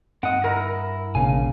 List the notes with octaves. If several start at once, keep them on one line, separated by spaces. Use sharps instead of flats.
G2 C4 D#5 F#5
E4 A#4 A#6
E1 A1 C#3 F5 G#5